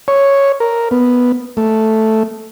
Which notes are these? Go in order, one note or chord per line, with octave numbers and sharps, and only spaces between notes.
C#5
A#4
B3
A3